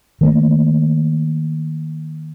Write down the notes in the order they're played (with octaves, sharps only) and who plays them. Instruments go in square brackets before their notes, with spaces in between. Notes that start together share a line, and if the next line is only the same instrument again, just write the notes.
[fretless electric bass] D#3 A3 A#3